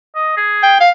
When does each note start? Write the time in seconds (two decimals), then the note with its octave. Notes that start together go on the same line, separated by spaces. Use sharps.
0.15 D#5
0.37 G#4
0.63 G5
0.80 F5